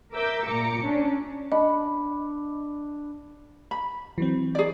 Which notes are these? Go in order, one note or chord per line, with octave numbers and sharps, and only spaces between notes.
A#4 E5 D6 E6 G6
A#2 A#5 D6 C#7
C#4 D4
D4 D#5 B5
B5
E3 F#3 C4
G#4 D5